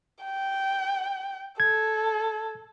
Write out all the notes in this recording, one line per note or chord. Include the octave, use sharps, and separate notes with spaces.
G5
A4 G#6